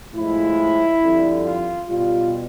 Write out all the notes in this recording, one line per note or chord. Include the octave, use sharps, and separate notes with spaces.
A2 F3 G#3 E4
F2 D3 G3
F4
B2 G3 F4